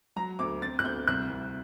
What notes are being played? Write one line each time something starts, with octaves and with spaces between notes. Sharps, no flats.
F#3 A#5
D2 D6
C4 A6
F#6
D2 G6
C2 F#6
C2